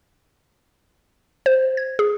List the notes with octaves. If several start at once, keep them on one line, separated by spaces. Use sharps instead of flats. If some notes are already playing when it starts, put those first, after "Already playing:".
C5
G#6
G#4